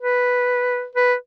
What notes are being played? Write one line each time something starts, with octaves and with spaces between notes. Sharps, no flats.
B4
B4